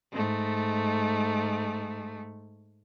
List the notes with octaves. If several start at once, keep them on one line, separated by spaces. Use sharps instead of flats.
G#2 A3